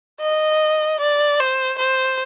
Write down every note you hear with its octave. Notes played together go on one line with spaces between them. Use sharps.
D#5
D5
C5
C5